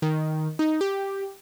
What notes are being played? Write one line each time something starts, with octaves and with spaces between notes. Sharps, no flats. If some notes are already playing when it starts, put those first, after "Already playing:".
D#3
D#4
G4